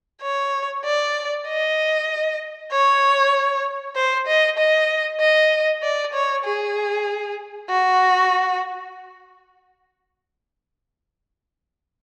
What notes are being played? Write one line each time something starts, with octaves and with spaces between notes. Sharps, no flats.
C#5
D5
D#5
C#5
C5
D#5
D#5
D#5
D5
C#5
G#4
F#4